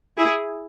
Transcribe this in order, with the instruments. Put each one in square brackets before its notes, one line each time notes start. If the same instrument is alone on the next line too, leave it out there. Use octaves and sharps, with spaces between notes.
[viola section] E4 G#4